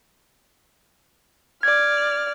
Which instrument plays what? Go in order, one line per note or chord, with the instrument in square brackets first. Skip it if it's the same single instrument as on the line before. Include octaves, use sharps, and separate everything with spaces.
[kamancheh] D5 F6 [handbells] G#6